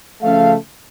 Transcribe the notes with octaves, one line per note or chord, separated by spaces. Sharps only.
C#3 F3 A3 F5